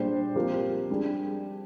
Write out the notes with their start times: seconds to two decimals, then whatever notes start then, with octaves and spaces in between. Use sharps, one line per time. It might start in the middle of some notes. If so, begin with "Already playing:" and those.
Already playing: A#2 G3 D4 G#4 C5
0.36 F3 C4 G4 A#4
0.90 G3 D4 G#4